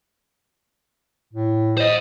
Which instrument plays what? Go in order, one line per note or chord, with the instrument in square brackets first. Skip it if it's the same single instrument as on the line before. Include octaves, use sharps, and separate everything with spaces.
[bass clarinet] A2
[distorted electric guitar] C5 D#5